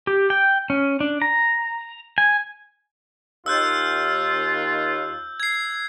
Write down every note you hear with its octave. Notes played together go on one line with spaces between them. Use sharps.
G4
G5
C#4
D4
A#5
G#5
D#2 F4 E6 F#6 G6
G#6 C7